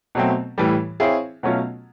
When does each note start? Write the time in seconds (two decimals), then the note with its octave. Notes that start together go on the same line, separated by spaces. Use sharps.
0.15 B2 F#3 A3 C4
0.58 A2 E3 G3
1.00 C4 E4 G#4 C#5 F5
1.43 B2 F#3 A3 C#4 F4